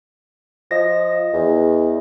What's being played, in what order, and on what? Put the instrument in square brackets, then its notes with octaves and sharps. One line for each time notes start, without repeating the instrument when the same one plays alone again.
[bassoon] F3 [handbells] D#5 A#6
[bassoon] E2